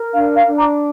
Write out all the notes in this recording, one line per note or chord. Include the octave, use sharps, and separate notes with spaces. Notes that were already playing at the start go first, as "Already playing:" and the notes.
Already playing: A#4
D4 F5
F5
D4
A#5 D6